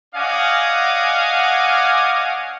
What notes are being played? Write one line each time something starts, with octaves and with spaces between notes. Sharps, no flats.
C#4 D5 D#5 F5 F#5 G#5